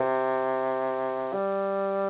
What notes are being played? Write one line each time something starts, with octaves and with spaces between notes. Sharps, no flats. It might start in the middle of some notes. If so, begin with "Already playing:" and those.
Already playing: C3
G3